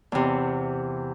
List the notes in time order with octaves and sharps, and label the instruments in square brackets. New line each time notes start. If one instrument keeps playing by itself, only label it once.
[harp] E2 C3